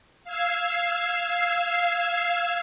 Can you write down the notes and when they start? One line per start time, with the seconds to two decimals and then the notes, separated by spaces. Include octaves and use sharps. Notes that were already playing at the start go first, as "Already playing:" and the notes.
0.24 F5 E6 G#6 C7